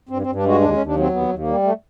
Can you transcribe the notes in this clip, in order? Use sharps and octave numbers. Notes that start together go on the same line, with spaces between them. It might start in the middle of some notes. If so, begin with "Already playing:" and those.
G2 C4
C4
G2
D4
G#3 F#4
D#2 D4
C#4
D#2
D4
F#3 C4
D#2 B3
D#2
A#3
G3
A3